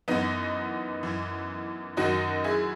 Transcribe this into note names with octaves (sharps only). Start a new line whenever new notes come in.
F#2 E3 B3 D#4
F#2 E3
F#2 D#3 F#3 D#4 F#4
E4 G#4